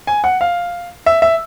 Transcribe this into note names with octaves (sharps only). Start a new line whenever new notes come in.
G#5
F#5
F5
E5
E5